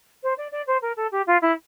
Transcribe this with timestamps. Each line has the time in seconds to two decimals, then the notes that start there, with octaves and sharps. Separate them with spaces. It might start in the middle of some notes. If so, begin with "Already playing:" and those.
0.23 C5
0.38 D5
0.52 D5
0.67 C5
0.82 A#4
0.97 A4
1.12 G4
1.27 F4
1.42 E4